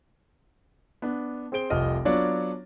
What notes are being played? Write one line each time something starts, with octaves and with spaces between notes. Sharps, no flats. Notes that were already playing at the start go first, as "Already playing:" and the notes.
B3 D4
C4 G#4 C5 D7 G7
F1 C2 F3 D#5 F6
F#3 B3 D4 F4 C#5 D5